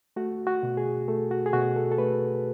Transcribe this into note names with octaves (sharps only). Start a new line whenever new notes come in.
A3 F#4
F#4
B2
G#4
A3 A4
F#4
G#4
B2 F#4
A4
A4
A3 B4